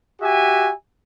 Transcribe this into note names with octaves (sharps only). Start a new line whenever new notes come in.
F#4 G4 E5 G#5